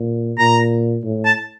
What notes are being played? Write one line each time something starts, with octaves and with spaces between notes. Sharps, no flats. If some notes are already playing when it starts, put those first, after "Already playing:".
Already playing: A#2
A#2 A#5
A2
A5